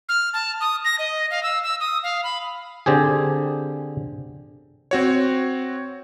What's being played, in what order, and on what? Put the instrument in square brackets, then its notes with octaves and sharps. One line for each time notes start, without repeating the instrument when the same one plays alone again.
[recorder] F6
A5
D#6
A#6
D#5
F5
E6
E6
D#6
F5
B5
[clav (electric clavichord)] D3 C4 G4 G#4
[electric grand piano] C4 F#4 C#5